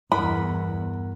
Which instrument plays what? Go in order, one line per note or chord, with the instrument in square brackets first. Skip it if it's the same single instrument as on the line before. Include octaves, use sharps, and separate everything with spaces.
[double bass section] E2 [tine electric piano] G2 A#4 F#5 [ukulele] B5